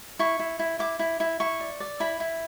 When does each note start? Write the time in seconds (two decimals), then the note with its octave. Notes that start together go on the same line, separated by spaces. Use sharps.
0.19 E4 C#6
0.39 E4
0.59 E4
0.79 E4 D6
0.99 E4
1.20 E4
1.40 E4 C#6
1.60 D5
1.80 D5
2.00 E4 B5
2.20 E4